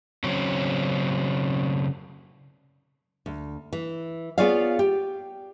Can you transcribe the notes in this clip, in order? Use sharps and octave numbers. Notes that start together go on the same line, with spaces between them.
C#3 F#3 C4 C#4
D2
E3
B3 F4 G#4 C#5 D5 F5
G4